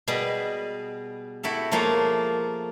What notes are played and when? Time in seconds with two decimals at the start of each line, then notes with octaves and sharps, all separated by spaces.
0.08 B2 G3 G#4 B4 D#5
1.43 E4 F#4 G4 A4
1.72 F3 A3 A#3 F4 G#4 C#5